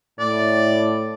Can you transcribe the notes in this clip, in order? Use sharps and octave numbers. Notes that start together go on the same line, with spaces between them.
A2 D5